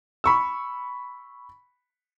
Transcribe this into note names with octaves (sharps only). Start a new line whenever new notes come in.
B5 C#6 E6